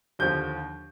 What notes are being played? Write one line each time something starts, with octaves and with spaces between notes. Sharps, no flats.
D#2 D3 F3 G6